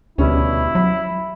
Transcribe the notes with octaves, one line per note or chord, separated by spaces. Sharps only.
D2 B2 G3 C#4 E4
F#3 B5